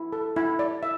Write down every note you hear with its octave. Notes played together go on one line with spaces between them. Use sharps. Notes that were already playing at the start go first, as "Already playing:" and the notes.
Already playing: E4
A4
E4
D5
E5